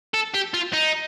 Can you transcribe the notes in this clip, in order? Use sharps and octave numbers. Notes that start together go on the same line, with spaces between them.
A4
G4
F4
D#4